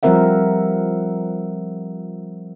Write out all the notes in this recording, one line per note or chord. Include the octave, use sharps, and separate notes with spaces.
F3 G3 C4 A#4 E5 F#5